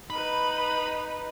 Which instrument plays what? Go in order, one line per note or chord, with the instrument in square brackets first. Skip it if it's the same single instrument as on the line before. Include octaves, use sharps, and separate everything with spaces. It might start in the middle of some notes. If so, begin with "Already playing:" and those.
[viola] D#4 B4 [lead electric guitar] B5